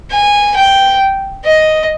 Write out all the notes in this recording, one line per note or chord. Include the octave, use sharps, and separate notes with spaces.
G#5
G5
D#5